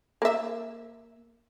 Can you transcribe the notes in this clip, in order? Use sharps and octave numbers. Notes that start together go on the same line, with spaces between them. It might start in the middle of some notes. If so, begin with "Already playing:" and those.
A#3 E5